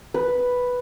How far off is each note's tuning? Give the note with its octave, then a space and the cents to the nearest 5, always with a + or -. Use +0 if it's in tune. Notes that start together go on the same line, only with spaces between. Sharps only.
B4 +0